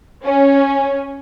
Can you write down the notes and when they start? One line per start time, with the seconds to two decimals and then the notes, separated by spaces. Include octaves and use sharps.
0.24 C#4